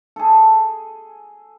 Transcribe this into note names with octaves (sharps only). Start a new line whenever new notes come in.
G#4 A4